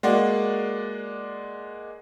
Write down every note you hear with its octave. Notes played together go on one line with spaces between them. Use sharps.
G#3 A#3 F#4 D5